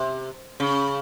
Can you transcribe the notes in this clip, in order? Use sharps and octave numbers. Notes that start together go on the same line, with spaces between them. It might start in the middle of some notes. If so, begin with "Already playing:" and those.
Already playing: C3
C#3